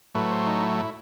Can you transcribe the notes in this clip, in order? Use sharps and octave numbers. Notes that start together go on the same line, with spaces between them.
A2 F#3 A3 B4
C5
D#4
E4
E4